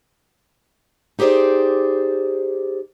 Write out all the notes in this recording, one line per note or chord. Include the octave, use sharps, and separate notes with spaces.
D#4 G4 G#4 C5 D5